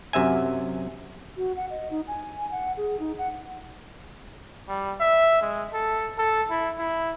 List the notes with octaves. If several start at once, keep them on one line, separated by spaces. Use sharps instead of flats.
F#2 C3 E5 G#5
F#4
F#5
D#5
D#4
G#5
F#5
G#4
D#4
F#5
G3
E5
G#3
A4
A4
E4
E4